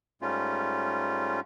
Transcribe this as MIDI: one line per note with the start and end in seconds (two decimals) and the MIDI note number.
0.22 1.40 44
0.22 1.40 55
0.22 1.40 57
0.22 1.40 61
0.22 1.40 65